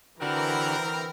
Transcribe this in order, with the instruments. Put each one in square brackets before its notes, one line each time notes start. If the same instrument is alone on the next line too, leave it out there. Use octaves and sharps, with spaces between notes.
[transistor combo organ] D3 F#4 [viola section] E3 A#5 B5 [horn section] C4 A#4